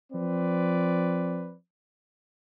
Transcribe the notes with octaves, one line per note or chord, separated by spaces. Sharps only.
F3 C4 B4 D5